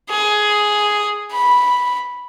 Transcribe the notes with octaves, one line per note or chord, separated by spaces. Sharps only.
G#4
B5